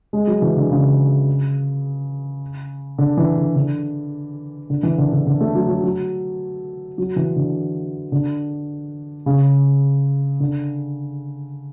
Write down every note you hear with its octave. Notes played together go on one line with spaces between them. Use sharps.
G#3
F#3
E3
D3
C#3
D3
E3
D3
D3
D3
E3
D3
D3
D3
A3
F#3
F#3
F#3
F#3
E3
D3
D3
C#3
D3